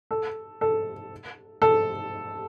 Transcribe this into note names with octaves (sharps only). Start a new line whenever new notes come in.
A4
A4
A4